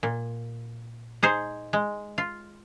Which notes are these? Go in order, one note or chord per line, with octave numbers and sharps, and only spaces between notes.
A#2
D#4 G#4 C5
G#3
F4